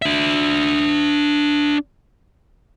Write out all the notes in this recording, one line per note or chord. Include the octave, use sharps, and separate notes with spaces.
D4 E5